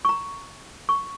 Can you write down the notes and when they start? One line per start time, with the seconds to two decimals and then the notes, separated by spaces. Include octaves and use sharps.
0.05 A#5 C#6
0.89 C#6